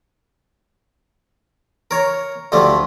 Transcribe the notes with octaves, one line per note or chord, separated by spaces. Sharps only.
A#4 C#5
D2 F3 G3 A3